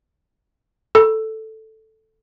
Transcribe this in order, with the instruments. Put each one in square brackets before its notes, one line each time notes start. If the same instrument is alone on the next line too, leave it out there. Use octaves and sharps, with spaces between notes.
[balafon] A4